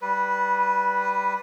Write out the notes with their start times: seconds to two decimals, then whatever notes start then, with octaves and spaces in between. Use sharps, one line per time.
0.02 G3 B4